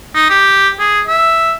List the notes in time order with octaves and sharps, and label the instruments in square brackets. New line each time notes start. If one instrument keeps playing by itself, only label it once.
[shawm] D#4
G4
G#4
E5